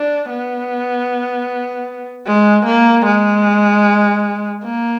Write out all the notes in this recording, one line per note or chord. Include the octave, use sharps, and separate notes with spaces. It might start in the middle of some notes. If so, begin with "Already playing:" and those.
Already playing: D4
B3
G#3
A#3
G#3
A#3